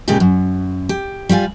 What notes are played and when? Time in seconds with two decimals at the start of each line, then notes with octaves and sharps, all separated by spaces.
0.08 A#2 C#3 G3 G#3 G4 G#4
0.20 F#2
0.89 G4
1.29 G3 F4 F5 G#5